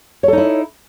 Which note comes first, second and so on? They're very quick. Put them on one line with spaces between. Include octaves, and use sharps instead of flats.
C#5 A4 D#4 E4